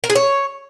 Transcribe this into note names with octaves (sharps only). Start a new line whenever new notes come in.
A#4
G#4
C#5